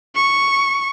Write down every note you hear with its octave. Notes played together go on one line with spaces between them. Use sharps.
C#6